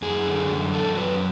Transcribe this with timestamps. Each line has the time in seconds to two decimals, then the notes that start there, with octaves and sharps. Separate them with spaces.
0.02 F#2 G#4
0.27 D3
0.50 F#2
0.74 F#3 A4
0.97 F#2 B4